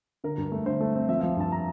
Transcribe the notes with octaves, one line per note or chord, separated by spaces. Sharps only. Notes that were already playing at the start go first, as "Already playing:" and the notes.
D3 A#4
G2
A3
D3 C5
A3
C4
F3 E5
F3 F5
G2 A5
A#5